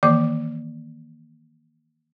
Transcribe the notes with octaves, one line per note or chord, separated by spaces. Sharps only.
D#3 E3 A#3 D5 D6